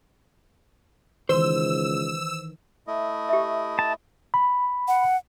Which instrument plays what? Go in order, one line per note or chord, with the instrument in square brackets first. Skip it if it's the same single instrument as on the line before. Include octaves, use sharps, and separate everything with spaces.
[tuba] C#2 [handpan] D#3 E3 [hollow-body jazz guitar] C5 [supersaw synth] E6
[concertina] A3 E4 D#5
[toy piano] G4 E5
[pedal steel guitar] A5
[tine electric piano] B5
[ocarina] F#5